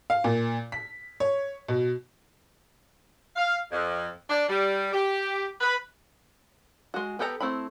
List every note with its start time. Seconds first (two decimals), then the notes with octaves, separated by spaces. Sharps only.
0.10 F5
0.24 A#2
0.72 B6
1.20 C#5
1.68 B2
3.36 F5
3.71 F2
4.29 D4
4.49 G3
4.93 G4
5.60 B4
6.94 G#3 F#4
7.19 B3 G4 A4 D5 A#5
7.40 A3 C4 E4 B5